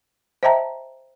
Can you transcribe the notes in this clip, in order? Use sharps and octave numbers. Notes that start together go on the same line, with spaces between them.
C5 D#5 E5 G5 A5 A#5